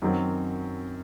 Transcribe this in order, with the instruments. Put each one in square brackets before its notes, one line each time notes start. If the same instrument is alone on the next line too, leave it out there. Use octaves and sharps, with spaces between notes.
[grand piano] F#2 D#3 F#3 C4